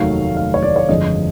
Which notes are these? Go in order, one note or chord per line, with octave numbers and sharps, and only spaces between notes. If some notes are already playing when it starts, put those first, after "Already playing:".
Already playing: F1 D#2 D#3 F#3 A3 F5
F5
C#5
D5
C#5
G1 F2 D3 F3 G#3 D#5